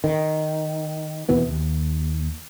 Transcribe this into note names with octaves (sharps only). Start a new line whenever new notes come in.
D#3
E2 B2 E3 B3
D#2